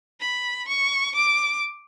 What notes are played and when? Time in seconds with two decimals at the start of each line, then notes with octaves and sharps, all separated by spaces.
0.21 B5
0.68 C#6
1.15 D6